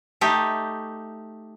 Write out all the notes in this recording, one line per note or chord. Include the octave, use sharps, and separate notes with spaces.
A3 D#4 G4